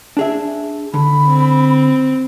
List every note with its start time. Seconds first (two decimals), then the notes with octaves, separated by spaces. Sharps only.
0.17 D4 G#4 E5
0.94 D3 B5
1.27 C4